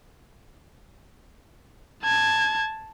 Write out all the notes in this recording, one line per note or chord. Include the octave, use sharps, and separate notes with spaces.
A5 G#6